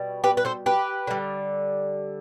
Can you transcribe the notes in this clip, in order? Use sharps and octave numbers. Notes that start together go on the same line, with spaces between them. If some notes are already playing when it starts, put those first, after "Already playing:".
Already playing: B2 G3
G4 B4
B4
A4 C5
G4 B4
D3 G3